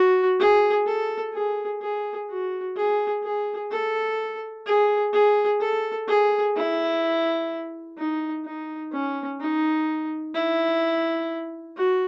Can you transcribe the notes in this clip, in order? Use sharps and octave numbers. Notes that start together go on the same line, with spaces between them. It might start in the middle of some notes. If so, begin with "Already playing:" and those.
Already playing: F#4
G#4
A4
G#4
G#4
F#4
G#4
G#4
A4
G#4
G#4
A4
G#4
E4
D#4
D#4
C#4
D#4
E4
F#4